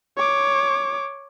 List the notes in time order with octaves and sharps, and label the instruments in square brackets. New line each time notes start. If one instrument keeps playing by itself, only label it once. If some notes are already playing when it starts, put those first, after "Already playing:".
[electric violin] C#5 D6